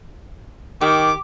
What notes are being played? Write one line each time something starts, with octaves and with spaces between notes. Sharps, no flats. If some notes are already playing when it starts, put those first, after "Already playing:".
D#3 G4 D6